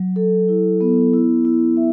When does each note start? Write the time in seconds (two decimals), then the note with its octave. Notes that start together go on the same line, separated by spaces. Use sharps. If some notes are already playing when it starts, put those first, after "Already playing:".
Already playing: F#3
0.16 A4
0.48 E4
0.81 B3
1.14 E4
1.45 E4
1.77 E5